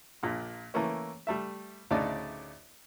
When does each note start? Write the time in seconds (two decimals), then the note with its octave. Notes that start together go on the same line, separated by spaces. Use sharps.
0.23 A#1 A#2
0.74 E3 A3 A#3 C#4
1.27 G3 A3 E5
1.91 D2 A2 C#3 D#4 D5